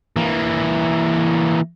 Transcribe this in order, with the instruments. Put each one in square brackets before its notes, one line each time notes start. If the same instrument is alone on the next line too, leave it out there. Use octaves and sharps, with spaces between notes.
[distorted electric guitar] E3 A#3